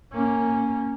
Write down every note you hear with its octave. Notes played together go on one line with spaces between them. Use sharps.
A#3 C#4